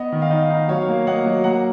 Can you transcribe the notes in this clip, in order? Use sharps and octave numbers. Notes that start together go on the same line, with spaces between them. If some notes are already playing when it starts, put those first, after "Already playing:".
Already playing: B3 D#5
D#3
F5
D#4 D#5
D#4
F#3 C#5 F5
A#3
A#3 D#5 F#5
F#3
A#3 F#5 A#5